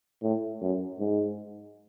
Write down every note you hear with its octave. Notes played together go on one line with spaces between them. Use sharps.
A2
F#2
G#2